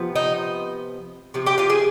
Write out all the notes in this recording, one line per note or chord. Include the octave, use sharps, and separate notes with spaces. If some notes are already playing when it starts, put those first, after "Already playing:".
Already playing: C3 F3 B3
D#4
C3 F3
G4 G5
F4 F5
G#4 G#5